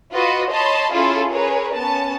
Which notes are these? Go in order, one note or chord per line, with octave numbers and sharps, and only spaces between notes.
F4 F#4 B4 D#5
C#5 D#5 A5 B5 C6
C#4 E4 F4 G#4 A4
G#4 A#4 B4 C#5
B3 C#4 A5